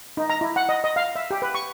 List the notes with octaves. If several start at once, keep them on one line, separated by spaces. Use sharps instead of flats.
D#4
A#5
E4
F#5
D#5
D#5
F5
E5
G4
B4
C#6